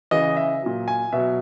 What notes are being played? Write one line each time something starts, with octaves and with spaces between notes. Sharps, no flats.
C#3 E3 D#5
E5
A#2 F#3
G#5
B2 F#3 E5